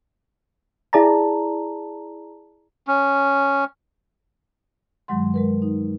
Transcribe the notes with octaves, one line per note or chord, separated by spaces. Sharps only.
E4 G#4 D5 A5 A#5
C#4
G2 D#3 F#3 G#3 F#5 C6
G#3 A#4 B4
D#4